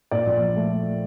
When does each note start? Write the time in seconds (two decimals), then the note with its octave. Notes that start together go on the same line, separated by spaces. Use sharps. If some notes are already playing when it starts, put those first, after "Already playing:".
0.11 A#2 D5
0.26 A#1
0.41 F3
0.56 A3